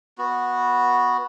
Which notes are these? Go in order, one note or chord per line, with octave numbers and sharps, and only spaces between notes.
B3 F#4